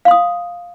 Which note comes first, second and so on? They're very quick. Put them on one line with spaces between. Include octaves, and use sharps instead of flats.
F5 C6 D#6